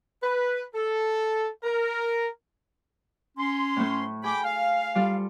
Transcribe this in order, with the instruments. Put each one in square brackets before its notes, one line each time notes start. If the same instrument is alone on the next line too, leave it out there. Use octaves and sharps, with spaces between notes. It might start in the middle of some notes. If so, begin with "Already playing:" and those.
[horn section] B4
A4
A#4
[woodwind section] C#4 C6
[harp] A2 A3
[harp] G#4 [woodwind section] G5 B5 D6
[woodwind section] F5
[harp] G3 F4 A4